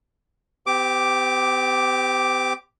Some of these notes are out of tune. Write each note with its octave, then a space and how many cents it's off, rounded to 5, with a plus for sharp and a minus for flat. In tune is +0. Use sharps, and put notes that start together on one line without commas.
C4 -45 G4 +0 D6 +0